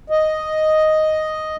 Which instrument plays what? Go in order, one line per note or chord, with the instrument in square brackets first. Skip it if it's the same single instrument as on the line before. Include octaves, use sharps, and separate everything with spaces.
[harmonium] D#5